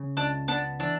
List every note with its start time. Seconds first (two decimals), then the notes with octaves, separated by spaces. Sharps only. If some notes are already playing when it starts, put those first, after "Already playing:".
Already playing: C#3
0.17 C#2 D4
0.48 B3 D4
0.79 E3 D4